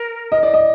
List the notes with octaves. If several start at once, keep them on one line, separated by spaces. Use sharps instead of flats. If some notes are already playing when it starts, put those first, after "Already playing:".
Already playing: A#4
D#5
D5
D#5